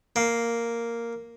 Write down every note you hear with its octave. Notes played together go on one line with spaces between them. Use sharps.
A#3